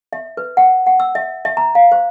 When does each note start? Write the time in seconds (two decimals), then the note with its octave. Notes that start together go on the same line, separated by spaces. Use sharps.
0.13 E5
0.37 B4
0.57 F#5
0.86 F#5
1.00 E6
1.15 E5
1.45 E5
1.57 A#5
1.75 F5
1.92 C5